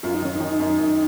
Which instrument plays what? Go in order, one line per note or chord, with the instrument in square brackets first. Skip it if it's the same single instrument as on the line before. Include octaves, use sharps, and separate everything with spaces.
[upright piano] F#2 [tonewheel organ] F4
[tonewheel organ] D#4
[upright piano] D#3 [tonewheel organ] C#4
[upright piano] D#3 [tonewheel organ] D#4
[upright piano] F#2
F#2